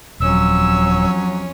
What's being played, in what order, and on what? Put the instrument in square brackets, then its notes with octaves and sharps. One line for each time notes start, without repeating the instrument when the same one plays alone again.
[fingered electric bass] D#1 [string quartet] F2 C#4 [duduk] F#3 [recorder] E6